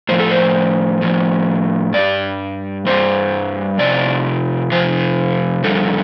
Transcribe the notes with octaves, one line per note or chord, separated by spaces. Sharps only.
A2 F3 C5
A4
C5
A2 F3
G2 G3 D5
G2 G3 C5
F2 C3 D5
F2 C3 F3 C5
F2 D3 G3 A4